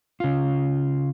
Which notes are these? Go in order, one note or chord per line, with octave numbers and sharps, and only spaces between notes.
C#3 F4